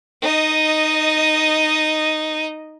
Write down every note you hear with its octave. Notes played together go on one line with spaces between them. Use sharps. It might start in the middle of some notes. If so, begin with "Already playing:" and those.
D#4 D#5